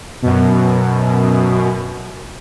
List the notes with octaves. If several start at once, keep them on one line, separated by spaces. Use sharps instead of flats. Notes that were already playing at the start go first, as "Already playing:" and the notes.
F#2 B2